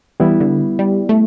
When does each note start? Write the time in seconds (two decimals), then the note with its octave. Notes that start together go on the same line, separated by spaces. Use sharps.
0.20 E3 G3 B3 E4
0.40 D3
0.79 G3
1.09 A3